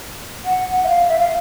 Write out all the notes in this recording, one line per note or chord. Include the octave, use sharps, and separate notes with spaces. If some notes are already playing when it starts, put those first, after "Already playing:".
F#5
E5
F5
E5
F5